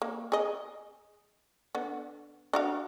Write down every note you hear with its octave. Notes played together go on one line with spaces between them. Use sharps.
A#3
G#4 D#5
D3 B3
D4 F#4 F5